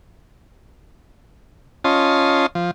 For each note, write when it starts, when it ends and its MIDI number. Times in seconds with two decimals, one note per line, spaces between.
1.84 2.46 61
1.84 2.46 65
1.84 2.46 75
1.84 2.46 81
1.84 2.46 84
2.55 2.71 53